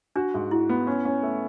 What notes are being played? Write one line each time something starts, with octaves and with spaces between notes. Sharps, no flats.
D4 F#4
G#2
E4 F#4
B3
C#4 F#4
C#4
A3